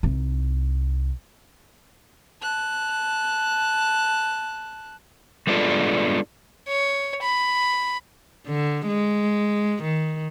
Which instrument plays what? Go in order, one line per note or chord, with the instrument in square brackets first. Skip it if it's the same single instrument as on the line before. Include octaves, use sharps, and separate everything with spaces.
[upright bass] C2 D#4
[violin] A5 F#6
[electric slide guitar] G3 G#3 B3 D4 F4 A4
[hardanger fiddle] C#5
B5
[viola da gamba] D3
G#3
D#3